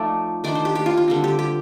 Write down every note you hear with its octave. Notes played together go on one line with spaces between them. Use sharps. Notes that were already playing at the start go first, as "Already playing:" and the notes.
Already playing: F3 A3 D#4 D5
D#3 A3 D4 D5
C5
G4
G4
F4
F4
D3 G3 C4
G4
G4